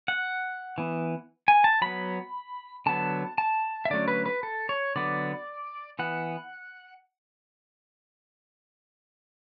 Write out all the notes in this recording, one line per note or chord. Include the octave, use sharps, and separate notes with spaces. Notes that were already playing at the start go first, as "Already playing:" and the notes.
F#5
E3 B3
G#5
A5
F#3 B3 B5
D3 F#3 B3 A5
A5
E5
D3 F#3 A3 C#4 D5
B4
B4
A4
C#5
D3 F#3 B3 D5
E3 B3 F#5